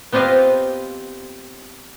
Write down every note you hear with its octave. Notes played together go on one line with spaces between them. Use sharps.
B3 C4 F4 G4 D#5 F5